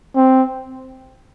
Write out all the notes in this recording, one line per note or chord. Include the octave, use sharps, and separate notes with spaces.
C4